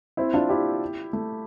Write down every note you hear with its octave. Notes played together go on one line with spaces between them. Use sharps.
C4 E4
D4 F4
E4 G4
A3